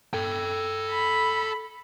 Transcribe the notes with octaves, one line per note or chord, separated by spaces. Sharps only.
A4 G5
B5